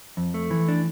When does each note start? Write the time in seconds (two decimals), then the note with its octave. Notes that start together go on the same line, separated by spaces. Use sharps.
0.17 F2
0.34 A3
0.51 E3
0.68 D4